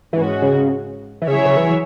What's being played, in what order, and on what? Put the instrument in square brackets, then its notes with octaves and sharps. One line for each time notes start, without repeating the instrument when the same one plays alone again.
[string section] G#2 G#3 C#4 F#4 [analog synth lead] E3
[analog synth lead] C#3
E3
[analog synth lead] C#3 [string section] F#3 E4 G#4 C#5 E5
[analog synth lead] C#3
E3